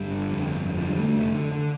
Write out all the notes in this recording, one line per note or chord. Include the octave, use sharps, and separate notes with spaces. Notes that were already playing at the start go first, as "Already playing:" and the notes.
Already playing: G1 G3
D3
F2
G1
F2
D3 F3
G3
D3 A3
F1
D3
D3